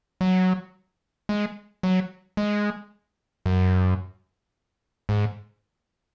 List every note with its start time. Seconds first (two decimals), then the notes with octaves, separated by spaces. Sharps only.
0.21 F#3
1.29 G#3
1.83 F#3
2.37 G#3
3.46 F#2
5.09 G#2